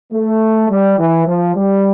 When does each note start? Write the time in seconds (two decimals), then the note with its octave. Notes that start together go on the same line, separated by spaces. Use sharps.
0.13 A3
0.70 G3
0.98 E3
1.26 F3
1.55 G3